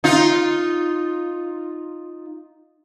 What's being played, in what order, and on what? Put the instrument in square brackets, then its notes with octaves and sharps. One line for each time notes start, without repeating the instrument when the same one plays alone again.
[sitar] D#4 F4